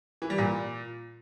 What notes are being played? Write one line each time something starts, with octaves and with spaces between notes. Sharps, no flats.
E3
G3
A#2